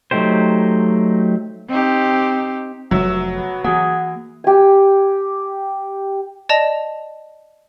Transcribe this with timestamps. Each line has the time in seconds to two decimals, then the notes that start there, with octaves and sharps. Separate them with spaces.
0.11 F#3 A3 D#4 G4 C5
1.69 C4 D#4 G4
2.91 F1 F#3 E5
3.33 B3
3.64 E3 A#3 F#4 G#4 F#5
4.44 G4 G#5
6.49 D5 D#5 A5 A#6 F7